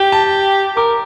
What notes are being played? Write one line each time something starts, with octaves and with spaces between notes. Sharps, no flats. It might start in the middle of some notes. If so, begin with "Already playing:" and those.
Already playing: G4 G5
A5
A#4 D6